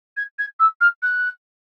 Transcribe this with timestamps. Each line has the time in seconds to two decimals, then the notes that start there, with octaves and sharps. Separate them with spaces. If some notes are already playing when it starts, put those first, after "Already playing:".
0.17 G#6
0.38 G#6
0.59 E6
0.80 F6
1.02 F#6